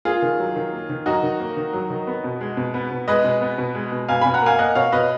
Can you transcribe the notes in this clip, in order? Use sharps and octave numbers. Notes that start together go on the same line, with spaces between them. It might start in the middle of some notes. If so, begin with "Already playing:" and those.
A#3 F4 G#4
D#3
F#3
D#3
A#3
D#3
F#3 D#4 F#4
D#3
A#3
D#3
F#3
D#3
B3
B2
G#3
B2
B3
B2
G#3 B4 D#5
B2
B3
B2
G#3
B2
B2 F5 G#5
B2 G#5 B5
F#5 A#5
A#3 F5 G#5
A#3 D#5 F#5
B2 C#5 F5
B2 B4 D#5